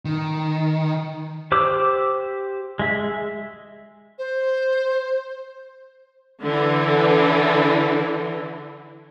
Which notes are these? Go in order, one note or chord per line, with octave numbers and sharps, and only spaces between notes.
D#3
G4 C5 D6 E6
G#3 E5
C5
D3 E3